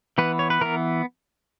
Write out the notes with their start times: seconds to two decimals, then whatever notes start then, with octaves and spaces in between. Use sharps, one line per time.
0.18 E3 B3 B4
0.39 C#5
0.50 B4
0.61 E3 B3 A#4